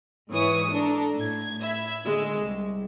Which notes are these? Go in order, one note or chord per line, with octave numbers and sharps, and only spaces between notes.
G#2 E3 C#5 C#6 D#6
D4 A4 A#5
A2 G#6
E5 B5 G#6
D3 G#3 E6
C2